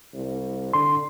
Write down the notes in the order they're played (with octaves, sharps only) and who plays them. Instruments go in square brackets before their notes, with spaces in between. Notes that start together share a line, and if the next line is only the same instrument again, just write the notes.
[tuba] C2
[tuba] D3 [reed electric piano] C6